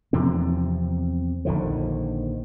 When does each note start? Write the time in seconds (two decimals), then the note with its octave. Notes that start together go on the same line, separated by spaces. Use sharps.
0.13 E2 C3 F3 C4
1.45 A#1 D3 D#3 F3